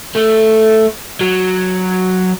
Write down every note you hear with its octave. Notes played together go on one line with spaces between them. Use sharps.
A3
F#3